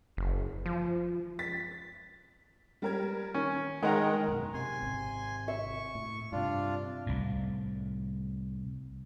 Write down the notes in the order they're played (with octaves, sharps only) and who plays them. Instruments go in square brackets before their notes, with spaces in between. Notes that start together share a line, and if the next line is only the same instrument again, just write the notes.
[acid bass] F#1
F3
[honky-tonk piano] A6 B6
G3 A#4 G#6
[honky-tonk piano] D#3 [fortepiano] C#4
[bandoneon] D#3 [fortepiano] G#3 F#5 A#5 [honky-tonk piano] A#4 D#5 G5
[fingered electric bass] F#2 B2
[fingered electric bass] C3 [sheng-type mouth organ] G#5 C6
[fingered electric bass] G#1 C3
[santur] E5 [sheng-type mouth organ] C#6
[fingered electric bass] A2
[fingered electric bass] G2 C3 [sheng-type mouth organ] D4 F4
[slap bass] C2 A2